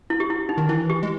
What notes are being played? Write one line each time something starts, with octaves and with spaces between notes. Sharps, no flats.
E4
G4
E4
D#4
D#3
E3 E4
G4
G#3